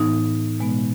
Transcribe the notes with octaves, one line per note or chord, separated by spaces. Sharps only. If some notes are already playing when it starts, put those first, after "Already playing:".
Already playing: A2 E3 B3 D#4
B2 G#3 B3